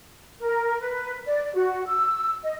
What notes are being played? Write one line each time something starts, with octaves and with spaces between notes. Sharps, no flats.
A#4
B4
D5
F#4
E6
D#5